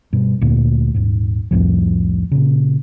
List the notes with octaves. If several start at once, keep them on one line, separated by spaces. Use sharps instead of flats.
G2 B2
D2 A#2 A3
D#1 G#2
C2 F2 A2 F3
A#2 C#3